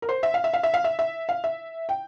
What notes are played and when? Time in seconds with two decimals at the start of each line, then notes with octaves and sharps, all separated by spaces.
0.02 A#4
0.09 C5
0.23 E5
0.34 F5
0.44 E5
0.54 F5
0.63 E5
0.74 F5
0.84 E5
0.99 E5
1.29 F5
1.44 E5
1.89 G5